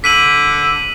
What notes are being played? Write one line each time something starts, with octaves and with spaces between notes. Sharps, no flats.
D3 B6 D#7 F#7